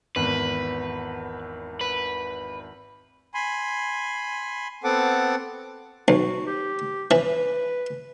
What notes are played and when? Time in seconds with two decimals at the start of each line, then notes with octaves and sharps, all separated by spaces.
0.16 G#1 E2 B4
1.81 B4
3.34 G#5 B5 C6
4.84 B3 C4 A4 F#5 D6
6.08 B1 F#4
6.46 G4
7.11 E3 B4